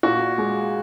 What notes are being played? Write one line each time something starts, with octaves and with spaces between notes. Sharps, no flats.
A#2 F#4
G#3